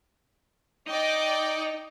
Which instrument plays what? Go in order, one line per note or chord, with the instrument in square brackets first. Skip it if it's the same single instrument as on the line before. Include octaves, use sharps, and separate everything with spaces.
[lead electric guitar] D#4 [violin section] D5 D#5 G5